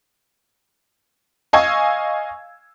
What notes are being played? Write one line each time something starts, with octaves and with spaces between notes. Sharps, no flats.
D#5 F5 G#5 C#6 E6 G#6